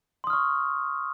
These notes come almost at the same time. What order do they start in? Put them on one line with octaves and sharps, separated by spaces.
C6 D#6 F6 C#6